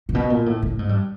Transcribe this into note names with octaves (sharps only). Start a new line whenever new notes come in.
A#2
B2
A#2
A2
A2
G#2
G2